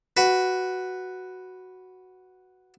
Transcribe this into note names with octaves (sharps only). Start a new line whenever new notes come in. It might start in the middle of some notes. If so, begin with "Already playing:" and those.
F#4 B4